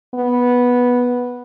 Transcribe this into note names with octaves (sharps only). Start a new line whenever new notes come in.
B3